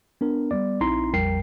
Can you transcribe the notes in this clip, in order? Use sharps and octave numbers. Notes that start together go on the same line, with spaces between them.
B3 D4 A#4
G3 B3 D5
A#1 C4 D#4 E4 A#5 C6
A#1 F2 G3 A#4 G5 C7